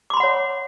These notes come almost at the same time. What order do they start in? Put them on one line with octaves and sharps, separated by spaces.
D6 C6 B5 F#5 C#5